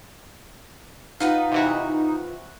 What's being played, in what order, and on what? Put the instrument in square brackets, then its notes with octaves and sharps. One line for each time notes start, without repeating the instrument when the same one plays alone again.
[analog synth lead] D#4 [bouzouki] F4 B4 F#5
[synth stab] C3 E3 F#4